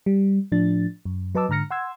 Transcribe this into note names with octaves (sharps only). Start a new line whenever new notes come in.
G3
A2 F3 D4 A6
F#2
F#3 B4 D#5 A5 D6 E6
G#2 D3 A#5 F6 A#6 C#7
F#5 C6 E6 G#6